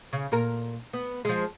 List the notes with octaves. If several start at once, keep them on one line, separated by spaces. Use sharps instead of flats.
C#3
A#2 A#4
B3
F3 G#3